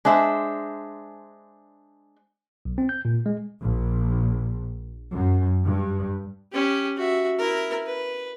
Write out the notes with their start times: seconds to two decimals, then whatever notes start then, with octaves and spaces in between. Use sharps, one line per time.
0.05 G#3 D4 C5 E5
2.65 B1
2.78 C4
2.89 G6
3.05 A#2
3.26 G#3
3.62 A#1
5.12 F#2
5.64 G2
6.53 C#4 G4
6.97 F#4 E5
7.39 E4 A#4
7.86 B4